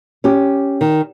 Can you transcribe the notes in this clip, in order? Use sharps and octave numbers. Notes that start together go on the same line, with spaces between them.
C#4 G4
D#3